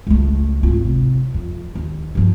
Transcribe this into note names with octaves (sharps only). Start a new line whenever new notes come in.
C#2 A3
G#1 F4
C3
F2
D#2
G2 F3